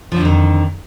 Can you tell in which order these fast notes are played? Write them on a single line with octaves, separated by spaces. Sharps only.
F3 D3 F2 D#3